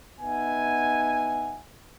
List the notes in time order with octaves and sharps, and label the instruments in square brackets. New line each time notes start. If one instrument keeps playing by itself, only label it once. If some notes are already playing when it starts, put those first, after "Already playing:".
[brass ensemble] B3 D#4 E5 F#5 G#5